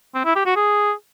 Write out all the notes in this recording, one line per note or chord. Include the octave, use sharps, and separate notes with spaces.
C4
E4
G4
F#4
G#4